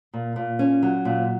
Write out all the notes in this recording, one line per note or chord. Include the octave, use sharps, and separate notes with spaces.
A#2
A#2
C#4
F#3
A#2